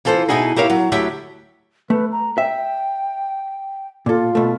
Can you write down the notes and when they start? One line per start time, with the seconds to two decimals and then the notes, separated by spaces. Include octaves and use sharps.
0.05 E3 F4 A4 B4 C5
0.29 B2 D#4 E4 F#4 G#4
0.56 E4 G4 A#4 C#5 F5
0.70 F#3
0.92 D2 F#3 E4 G4 E5 G5
1.90 A3 B4
2.12 A#5
2.38 E5 G5
4.06 A#2 F4 A4
4.35 B2 A3